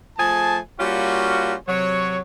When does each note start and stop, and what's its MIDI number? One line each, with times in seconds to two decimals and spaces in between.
0.18 0.58 53
0.18 0.58 57
0.18 0.58 68
0.18 0.58 80
0.18 0.58 81
0.80 1.54 55
0.80 1.54 58
0.80 1.54 61
0.80 1.54 65
0.80 1.54 66
1.68 2.18 48
1.68 2.18 54
1.68 2.18 73